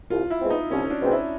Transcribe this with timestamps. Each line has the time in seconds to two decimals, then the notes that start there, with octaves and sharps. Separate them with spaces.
0.10 C2 F4
0.30 E4
0.41 B2 G#3 C4
0.50 D#4
0.70 C2 C#4
0.90 D4
1.01 B2 G#3 C4
1.12 E4